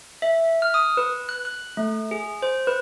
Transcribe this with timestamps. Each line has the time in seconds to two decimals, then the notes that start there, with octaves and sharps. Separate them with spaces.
0.22 E5
0.62 F6
0.74 D#6
0.97 B4
1.29 F#6
1.45 F#6
1.77 A3
2.11 G#4
2.42 C5
2.67 B4